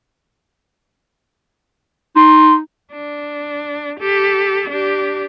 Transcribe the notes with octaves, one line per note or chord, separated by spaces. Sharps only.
D#4 C6
D4
G4 A4
D4 G4